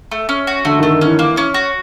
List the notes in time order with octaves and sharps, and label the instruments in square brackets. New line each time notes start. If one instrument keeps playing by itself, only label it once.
[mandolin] A3
C#4
F#4
[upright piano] D3 [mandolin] A3
[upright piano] D#3
[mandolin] A3
[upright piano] D#3
[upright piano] E3 [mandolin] C#4
[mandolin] A#3
C#4
F#4